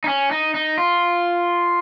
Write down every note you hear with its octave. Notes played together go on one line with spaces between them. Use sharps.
D#4
C#4
D#4
D#4
F4